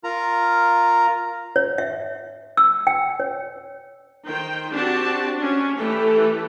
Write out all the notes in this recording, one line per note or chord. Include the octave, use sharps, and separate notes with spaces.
F4 A#4 A#5
C#5
E5
E6
G5
C#5
D#3 C5 G5
C4 D4 F#4 G4 A5
C#4 D4
E3 A3 G4 A4